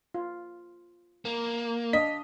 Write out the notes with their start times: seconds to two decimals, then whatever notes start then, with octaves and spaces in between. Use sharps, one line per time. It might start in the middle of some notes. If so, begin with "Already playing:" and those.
0.14 F4
1.25 A#3
1.93 D4 D#5 F5 B6